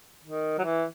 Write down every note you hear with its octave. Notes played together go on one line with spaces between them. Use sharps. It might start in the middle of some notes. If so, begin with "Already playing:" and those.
D#3
F#3
E3